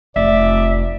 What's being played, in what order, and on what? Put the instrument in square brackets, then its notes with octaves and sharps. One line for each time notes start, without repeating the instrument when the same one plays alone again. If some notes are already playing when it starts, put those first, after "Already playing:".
[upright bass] F1 [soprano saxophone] D5 [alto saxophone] E5